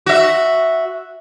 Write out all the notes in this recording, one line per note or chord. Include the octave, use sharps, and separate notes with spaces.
F#4 E5